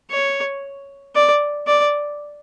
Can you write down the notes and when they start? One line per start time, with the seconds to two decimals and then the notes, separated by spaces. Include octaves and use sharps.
0.11 C#5
1.15 D5
1.67 D5